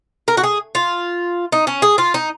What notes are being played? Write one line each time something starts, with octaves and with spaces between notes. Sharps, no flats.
A#4
F#4
G#4
F4
D#4
C#4
G#4
F4
D#4